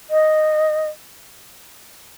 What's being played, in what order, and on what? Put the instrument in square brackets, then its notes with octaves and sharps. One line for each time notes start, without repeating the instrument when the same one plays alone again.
[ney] D#5